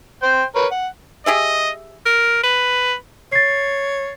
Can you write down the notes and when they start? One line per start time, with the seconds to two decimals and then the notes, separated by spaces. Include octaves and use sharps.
0.23 C5 G5
0.55 A#4 B4 C#5
0.71 F#5
1.26 G4 G#4 D#5 E5
2.06 A#4
2.43 B4
3.32 C#5 A6 C7